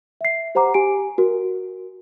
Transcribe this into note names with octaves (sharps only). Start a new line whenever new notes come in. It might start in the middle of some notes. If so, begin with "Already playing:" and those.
E5 C7
G4 C5 F#5 A#5 D6
G4 G#5 D7
F#4 A#4